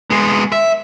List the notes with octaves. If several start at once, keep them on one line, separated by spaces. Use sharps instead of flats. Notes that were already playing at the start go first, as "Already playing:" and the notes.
G#3 B3
E5